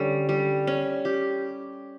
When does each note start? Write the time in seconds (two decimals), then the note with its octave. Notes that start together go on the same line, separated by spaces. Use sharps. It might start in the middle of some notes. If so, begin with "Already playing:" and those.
Already playing: D3 G3 C#4
0.29 G3
0.67 C#4
1.05 G4